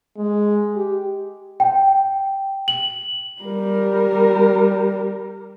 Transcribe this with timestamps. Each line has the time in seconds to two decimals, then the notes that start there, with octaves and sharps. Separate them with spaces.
0.17 G#3
0.75 G4
1.60 G5
2.68 F#7
3.42 G3 A#4